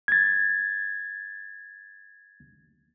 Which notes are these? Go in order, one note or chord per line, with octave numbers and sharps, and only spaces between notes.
G#6 A6